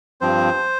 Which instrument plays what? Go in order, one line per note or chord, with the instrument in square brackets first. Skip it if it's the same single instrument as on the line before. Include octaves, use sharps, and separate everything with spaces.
[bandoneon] G2 F3 C4 C5